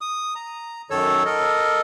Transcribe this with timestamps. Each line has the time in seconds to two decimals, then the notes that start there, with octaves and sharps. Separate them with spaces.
0.01 D#6
0.35 A#5
0.90 F#2 D#3 A4 C#5 E6
1.25 A4 A#4 D#5